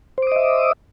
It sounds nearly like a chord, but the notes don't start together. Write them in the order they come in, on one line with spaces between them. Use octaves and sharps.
C5 D6 D#6 D#5 E5